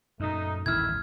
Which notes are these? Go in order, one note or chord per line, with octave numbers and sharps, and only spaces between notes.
F#2 A#2 A3 D#4
D#1 A1 A2 D#3 E4 F6 G#6